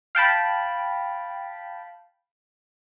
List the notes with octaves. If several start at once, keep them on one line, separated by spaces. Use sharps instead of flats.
F5 G5 A5 B5